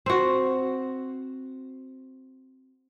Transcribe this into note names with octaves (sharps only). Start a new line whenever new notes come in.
C4 F#4